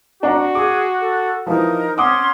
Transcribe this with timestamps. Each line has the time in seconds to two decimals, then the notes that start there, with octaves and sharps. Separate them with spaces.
0.23 D4 F#4 F#5 A#5
0.55 G#4 D6
1.00 A4
1.46 E3 F3 D#4 A#4
1.98 C#4 F#5 C6 D6 D#6